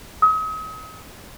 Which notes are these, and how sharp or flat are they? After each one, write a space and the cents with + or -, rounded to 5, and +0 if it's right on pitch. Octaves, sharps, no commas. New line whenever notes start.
D#6 +40